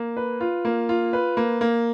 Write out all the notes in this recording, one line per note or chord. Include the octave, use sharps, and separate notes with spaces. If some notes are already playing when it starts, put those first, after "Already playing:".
Already playing: A#3
B4
F4
A#3
F4
B4
A#3
A#3